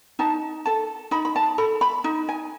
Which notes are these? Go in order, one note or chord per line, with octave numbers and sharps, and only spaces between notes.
D#4 A5
A4 A5
D#4 B5
B5
A5
A4 B5
B5
D#4
G#5